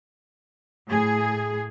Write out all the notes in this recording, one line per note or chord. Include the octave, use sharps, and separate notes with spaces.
A2 G#4